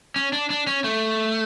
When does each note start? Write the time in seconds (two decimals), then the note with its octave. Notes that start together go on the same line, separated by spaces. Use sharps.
0.16 C#4
0.33 D4
0.50 D4
0.67 C#4
0.84 A3